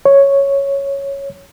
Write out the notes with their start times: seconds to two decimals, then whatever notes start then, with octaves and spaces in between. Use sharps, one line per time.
0.05 C#5